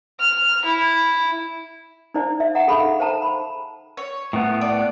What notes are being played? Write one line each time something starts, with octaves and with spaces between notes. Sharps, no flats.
F6
E4
D#4 E4 C5 D5
E5
E5 F#5 G5 A#5
D#4 G#4 A4 F5 B5 C#6
A4 C5 G5 A5 A#5
B5
C#5
A2 B3
D5